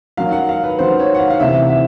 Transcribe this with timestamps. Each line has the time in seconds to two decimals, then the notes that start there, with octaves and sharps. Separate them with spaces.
0.17 D#2 D#3 F#3 F5
0.32 F#5
0.49 F5
0.64 B4
0.79 D#2 D#3 F#3 C5
1.00 C#5
1.15 F#5
1.19 F5
1.30 F5
1.40 D2 C3 E3 E5
1.70 E5